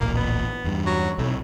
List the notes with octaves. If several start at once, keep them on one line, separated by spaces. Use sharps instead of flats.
D1 A1 A#2 A#3
B3
E2 G2
F#3
B1 A2 C3